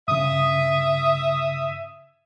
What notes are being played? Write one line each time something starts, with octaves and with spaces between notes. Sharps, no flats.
G2 C#3 E5 D#6